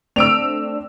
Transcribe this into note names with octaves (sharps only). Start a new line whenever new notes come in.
A3 C4 D4 E6 D7 F7